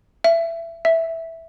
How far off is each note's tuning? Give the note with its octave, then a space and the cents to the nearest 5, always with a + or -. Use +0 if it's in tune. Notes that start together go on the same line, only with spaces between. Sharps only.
E5 +20
E5 -5